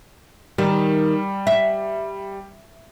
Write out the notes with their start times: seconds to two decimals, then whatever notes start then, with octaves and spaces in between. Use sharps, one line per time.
0.58 D#3 G3
1.47 E5